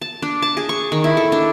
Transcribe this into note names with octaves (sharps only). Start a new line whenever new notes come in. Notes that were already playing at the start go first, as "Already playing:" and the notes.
A5
D4
A5
G#4
C#6
D#3
E4
A4
D4